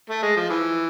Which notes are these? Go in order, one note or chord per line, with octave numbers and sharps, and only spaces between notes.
A3
G#3
F3
E3